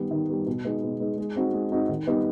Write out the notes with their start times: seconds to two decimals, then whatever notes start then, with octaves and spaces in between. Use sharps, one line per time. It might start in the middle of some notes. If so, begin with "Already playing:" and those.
Already playing: D#3 G3 B3
0.11 D#3
0.29 G3 B3
0.47 B2
0.65 G#3 B3 D#4
0.83 B2
1.00 G#3 B3 D#4
1.18 G#3
1.36 C4 D#4 F#4
1.54 G#3
1.72 C4 D#4 F#4
1.89 D#3
2.07 G3 B3 D#4